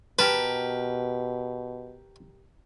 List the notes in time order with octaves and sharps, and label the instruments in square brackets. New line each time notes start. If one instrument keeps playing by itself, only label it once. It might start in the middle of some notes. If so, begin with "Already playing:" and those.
[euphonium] B2 [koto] G4 A#4 A5 [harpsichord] B4